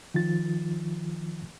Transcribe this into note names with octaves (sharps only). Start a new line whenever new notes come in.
D#3 F3 F4 A6